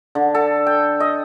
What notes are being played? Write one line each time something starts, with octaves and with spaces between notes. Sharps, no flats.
D3
A4
G5
D#5